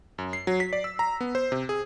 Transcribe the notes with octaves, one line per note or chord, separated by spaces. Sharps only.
F#2
C7
F#3
B6
D5
E6
A#5
B3
C5
C3
G#4